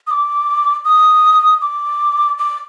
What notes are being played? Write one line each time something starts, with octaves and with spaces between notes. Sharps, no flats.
D#6
D6
D#6
D6
D6